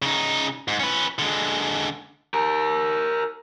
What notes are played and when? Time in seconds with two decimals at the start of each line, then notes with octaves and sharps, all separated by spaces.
0.02 C#3 D#4
0.68 G#2
0.80 C#4 B4
1.19 D3 G#3
2.34 G4 A#4